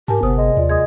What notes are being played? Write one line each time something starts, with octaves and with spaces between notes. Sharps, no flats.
G#2 G4 A#4 G#5 A5
G1 C3 B3 C5 D#6
G#3
D#2 F4 D5
G#3 D#6 G#6